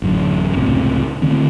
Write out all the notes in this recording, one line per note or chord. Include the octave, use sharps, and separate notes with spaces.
A1 F#2 D3
C#2 A2 C3
D3 D#3 A3 C4